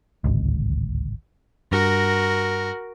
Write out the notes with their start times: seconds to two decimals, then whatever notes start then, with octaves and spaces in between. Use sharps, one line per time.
0.24 D1 G#1 C#2
1.72 G2 F#4 A#4